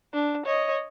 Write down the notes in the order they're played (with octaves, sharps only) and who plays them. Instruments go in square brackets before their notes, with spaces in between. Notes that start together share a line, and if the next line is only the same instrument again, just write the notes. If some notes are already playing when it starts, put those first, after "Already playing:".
[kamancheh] D4
C#5 D#5